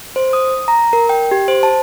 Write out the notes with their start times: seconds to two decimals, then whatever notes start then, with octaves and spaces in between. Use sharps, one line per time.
0.16 C5
0.33 D#6
0.68 A#5
0.93 A#4
1.09 G5
1.31 G4
1.48 C5
1.63 A5